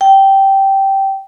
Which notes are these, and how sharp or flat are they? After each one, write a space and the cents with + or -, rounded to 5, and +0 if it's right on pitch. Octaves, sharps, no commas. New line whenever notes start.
G5 -10